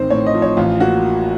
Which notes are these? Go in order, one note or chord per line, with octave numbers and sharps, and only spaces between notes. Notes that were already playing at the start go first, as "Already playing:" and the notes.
Already playing: A1 D#3 C4 C5
A2 C#5
D#5
F3
C#5
A1 F4
A#3 F#4